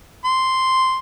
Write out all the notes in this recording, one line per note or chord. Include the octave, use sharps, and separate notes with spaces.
C6